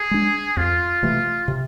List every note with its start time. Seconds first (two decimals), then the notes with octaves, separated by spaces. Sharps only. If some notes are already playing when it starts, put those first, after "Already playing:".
Already playing: G#4
0.11 G#3 D4
0.57 F2 F4
1.03 C3 E3 A3
1.48 C3